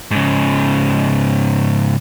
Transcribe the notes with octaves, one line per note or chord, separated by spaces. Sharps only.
G#2 C#3